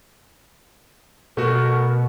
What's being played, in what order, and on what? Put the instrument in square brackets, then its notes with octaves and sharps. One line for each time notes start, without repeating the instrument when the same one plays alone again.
[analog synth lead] B2 [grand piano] A3 F#4 [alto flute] A#4